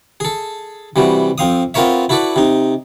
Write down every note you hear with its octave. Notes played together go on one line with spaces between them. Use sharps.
G#4 A4
C3 E3 G3 F#4
F2 C4 F5 D#6
B3 C4 F4 A#4 C#5 E5
E4 F#4 A4 B4 D5
C3 D#4